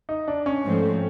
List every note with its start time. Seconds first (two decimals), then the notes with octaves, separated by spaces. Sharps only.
0.09 D#4
0.28 D4
0.46 C#4
0.65 G#2 F3 A3 C4